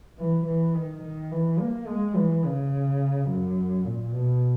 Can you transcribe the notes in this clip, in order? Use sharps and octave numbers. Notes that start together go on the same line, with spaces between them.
E3
E3
D#3
D#3
E3
A#3
G#3
E3
C#3
F#2
A#2
B2